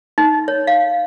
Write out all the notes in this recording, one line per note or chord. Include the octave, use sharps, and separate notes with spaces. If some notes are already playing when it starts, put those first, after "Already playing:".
D#4
C#5
F5